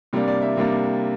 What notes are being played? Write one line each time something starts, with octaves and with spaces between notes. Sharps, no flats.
C3 G3 A#3 D4
D5
E5
C3 G3 A#3 D4